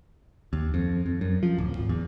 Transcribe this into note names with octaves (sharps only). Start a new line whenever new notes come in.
D#2
F2
F2
F#2
F3
D1
G#1
E2